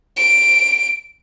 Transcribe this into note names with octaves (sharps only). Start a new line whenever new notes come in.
D7